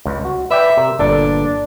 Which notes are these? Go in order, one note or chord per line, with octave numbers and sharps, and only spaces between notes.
C#2
F#4
B4 D5 E5 G5
C3 A#4
G1 A#2 D4 A4